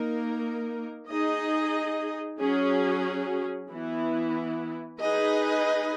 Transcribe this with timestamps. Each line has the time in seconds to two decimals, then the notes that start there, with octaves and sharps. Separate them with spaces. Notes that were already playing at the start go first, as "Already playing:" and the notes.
Already playing: A#3 D#4 A#4
1.09 D#4 G#4 D#5
2.39 F#3 C#4 G#4
3.69 E3 B3 E4
5.00 D#4 G#4 B4 D#5